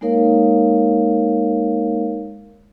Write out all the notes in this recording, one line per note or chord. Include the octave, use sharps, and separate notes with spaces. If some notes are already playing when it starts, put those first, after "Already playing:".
G#3 A#3 D#4 A#4 C#5 F5